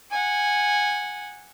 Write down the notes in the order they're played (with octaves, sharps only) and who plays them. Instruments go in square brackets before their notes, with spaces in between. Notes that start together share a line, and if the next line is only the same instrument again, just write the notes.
[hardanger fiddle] F#5 G#5